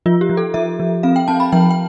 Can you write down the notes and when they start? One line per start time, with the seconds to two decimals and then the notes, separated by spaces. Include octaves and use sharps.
0.06 F3 F4
0.21 G4
0.29 F3
0.37 A4
0.54 F3 E5
0.80 F3
1.03 C4 F5
1.16 G5
1.28 C4 A5
1.40 B5
1.52 F3 G5
1.70 G5